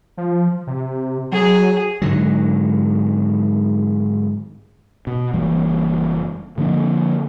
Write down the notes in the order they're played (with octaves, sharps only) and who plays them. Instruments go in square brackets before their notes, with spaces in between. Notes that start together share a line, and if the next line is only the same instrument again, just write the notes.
[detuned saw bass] F3
C3
[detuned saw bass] F#3 [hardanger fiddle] G#4
[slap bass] G#2 D3 D#3 F#3
[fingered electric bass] B2
F#1 E3 G3 A#3
D3 F3 A#3 D4